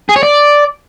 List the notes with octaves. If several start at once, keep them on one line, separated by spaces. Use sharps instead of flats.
G#4
C#5
D5